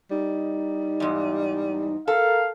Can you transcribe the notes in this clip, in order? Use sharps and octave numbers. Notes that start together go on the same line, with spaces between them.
G3 D#4
E2 G#2
A4 A#4 F5